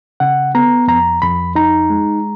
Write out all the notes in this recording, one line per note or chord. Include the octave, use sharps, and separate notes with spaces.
C#3 F#5
B3 A#5
F2 A#5
F2 B5
D#4 A#5
G#3